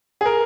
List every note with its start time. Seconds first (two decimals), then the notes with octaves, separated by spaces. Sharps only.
0.21 G#4
0.26 A#4